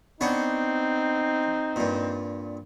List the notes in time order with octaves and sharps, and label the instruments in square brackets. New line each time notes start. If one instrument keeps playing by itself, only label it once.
[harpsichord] B3 D4 C#5 [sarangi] C4 [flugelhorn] D#4
[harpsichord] G2 A#2